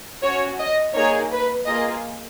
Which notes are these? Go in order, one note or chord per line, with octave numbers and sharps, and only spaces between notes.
C#4 F#4 C#5
D#5
A#3 D#4 G#4 C#5
B4
A#3 F4 G#4 D#5